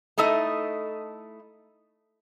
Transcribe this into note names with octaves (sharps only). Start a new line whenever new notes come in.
A3 D#4 E4 A4 D#5